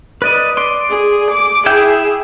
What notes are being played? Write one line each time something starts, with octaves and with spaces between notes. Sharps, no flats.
B4 D5 D#5
D5 C6
G#4
D6
E4 G#4 E5 G5